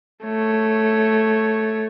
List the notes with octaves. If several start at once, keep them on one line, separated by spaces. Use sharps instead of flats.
A3 C#5